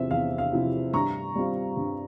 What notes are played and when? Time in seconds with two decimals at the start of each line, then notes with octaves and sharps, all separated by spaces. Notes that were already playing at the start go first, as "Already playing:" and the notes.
Already playing: E2 C3 F3 C4 E4 E5
0.11 E2 F5
0.38 F5
0.53 C3 F3 C4 E4
0.94 G2 A#5 C#6
1.36 G3 C4 F4
1.77 G2